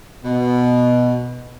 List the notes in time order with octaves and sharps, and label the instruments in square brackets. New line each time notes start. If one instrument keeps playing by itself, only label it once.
[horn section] B2